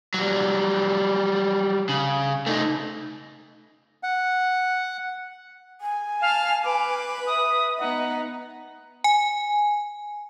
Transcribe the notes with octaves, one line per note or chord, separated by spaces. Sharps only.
F#3 G3
C#3
A3 D#4
F#5
G#5
F5 A5 F6
B4 D6
E5 D#6
B3 D#4 F#5
G#5